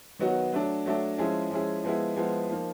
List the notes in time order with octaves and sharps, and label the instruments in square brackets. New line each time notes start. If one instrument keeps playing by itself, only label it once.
[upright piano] D#3 F#3 B3 D#4 F#4
F#3 A3 D4
F#3 A3 D4
F3 G#3 C#4 E4 G#4
F3 G#3 C#4 E4 G#4
F3 G#3 B3 E4 G#4
F3 G#3 B3 E4 G#4
F3 A#3 D#4